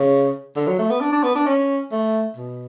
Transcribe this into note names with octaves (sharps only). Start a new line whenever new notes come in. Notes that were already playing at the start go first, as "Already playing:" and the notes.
Already playing: C#3
D3
F#3
A3
B3
D4
D4
B3
D4
C#4
A3
B2